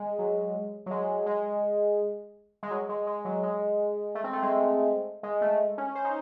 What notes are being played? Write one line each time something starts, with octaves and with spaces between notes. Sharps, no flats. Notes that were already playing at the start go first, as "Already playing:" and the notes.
Already playing: G#3
F#3
F#3
G#3
G#3
G#3
F#3
G#3
G#3
F#3
G#3
A3
C4
A3
G#3
G#3
A3
C#4
C5
D#4